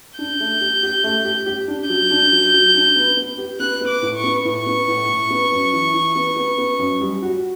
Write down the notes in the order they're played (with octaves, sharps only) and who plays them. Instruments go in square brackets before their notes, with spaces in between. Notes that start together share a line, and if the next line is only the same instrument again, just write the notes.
[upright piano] D4 [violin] G6
[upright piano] A3
G4
G4
A3
G4
G4
D4
[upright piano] F#3 [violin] G6
[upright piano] D4
F#3
F#3
D4
B3
B3
G4
[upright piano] B3 [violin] F#6
[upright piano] B3
[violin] D6
[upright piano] A2
[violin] C#6
[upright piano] B3
[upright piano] A2 [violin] C#6
[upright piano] B3
A2
A2
B3
F#2
E3
E3
B3
B3
B3
F#2
G3
F#4